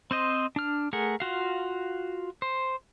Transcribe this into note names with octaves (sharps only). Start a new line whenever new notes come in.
C4 C5 D#5
D4 F6
A3 G#4 A#4 F#5
F4 F#4 F5
C5